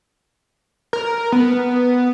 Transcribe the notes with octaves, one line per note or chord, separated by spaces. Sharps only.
A#4
B3